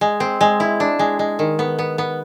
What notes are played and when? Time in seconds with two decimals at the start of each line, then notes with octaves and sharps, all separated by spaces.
0.01 G#3
0.20 C4
0.41 G#3
0.60 E4
0.80 D4
0.99 G#3
1.19 G#3
1.39 D#3
1.59 B3
1.79 B3
1.98 B3